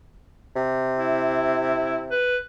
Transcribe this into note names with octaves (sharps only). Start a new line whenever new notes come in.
C3
E4
B4